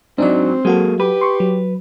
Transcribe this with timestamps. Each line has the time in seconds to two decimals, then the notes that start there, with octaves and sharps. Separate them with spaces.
0.18 G#2 F#3 C4 D4 D#4 D5
0.65 F#3 G#3 A#3 F#4 A4
1.00 G4 B4
1.21 C6 C#6
1.40 F#3